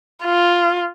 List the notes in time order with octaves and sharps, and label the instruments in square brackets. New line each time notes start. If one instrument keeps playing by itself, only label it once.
[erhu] F4